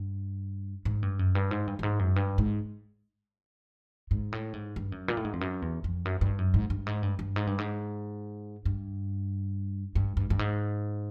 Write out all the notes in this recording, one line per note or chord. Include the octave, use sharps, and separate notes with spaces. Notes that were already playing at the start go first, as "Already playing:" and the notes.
Already playing: G2
G#2
G2
F#2
G2
G#2
G2
G2
G#2
F#2
G2
G#2
G#2
A2
G#2
G2
F#2
A#2
A2
G#2
F2
F#2
E2
F2
F#2
G2
F#2
G#2
G2
G#2
G2
G2
G#2
G2
G#2
G2
G2
G2
G2
G#2